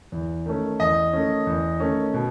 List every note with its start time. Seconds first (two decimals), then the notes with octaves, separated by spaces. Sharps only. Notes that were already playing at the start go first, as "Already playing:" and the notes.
0.12 E2
0.46 D#3 A3 C#4
0.80 E2 D#5
1.13 D#3 A3 C#4
1.47 E2
1.80 D#3 A3 C#4
2.14 B2